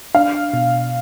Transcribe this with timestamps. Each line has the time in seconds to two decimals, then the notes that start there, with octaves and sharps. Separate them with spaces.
0.15 D4 F5
0.53 B2